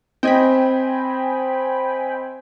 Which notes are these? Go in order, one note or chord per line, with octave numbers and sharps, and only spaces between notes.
C4 D#5 G5 G#5 B5